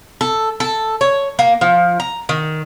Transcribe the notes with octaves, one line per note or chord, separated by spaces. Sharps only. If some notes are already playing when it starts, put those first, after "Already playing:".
A4
A4
C#5
A#3
F3
A#5
D#3